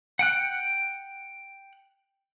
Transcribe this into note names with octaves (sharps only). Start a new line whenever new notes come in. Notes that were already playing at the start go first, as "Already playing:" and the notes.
F#5 G5 F#6